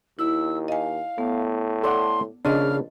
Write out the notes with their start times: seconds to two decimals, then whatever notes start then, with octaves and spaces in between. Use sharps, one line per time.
0.19 D#2 E4 E6
0.68 D#5 F5 G#5
1.18 A2 B3
1.83 A4 D5 F#5 C6
2.45 A#1 C#3 D4 D#5 C6 F6